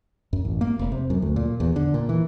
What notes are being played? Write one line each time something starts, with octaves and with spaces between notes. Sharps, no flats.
F#2
A1
A#3
F1
C3
F#2
D2
A#2
E2
D3
A#2
E3